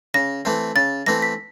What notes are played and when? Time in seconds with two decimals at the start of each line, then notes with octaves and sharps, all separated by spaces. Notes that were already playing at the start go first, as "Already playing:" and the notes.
0.14 C#3 A#6
0.45 E3 A3 C4
0.76 C#3 A6
1.06 E3 A3 C4 A#6
1.22 B6